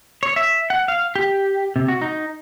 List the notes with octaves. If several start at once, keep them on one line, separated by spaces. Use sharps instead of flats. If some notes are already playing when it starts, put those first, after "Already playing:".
C#5
E5
F#5
F5
G4
C3
F#4
D#4